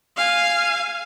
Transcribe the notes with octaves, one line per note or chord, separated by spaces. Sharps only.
F5 G#5